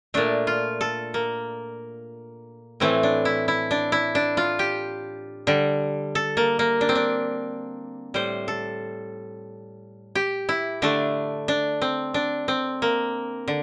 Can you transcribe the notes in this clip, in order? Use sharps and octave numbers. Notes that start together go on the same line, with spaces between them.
A#2 A3 D4
F4
A4
A#3
A2 E3 A3 C4
D4
E4
E4
D4
E4
D4
F4
G4
D3 G3
A4
A#3
A#3
D4
C4
D4
A2 G3 C5
A4
G4
E4
D3 A3 D4
D4
C4
D4
C4
A#3
D3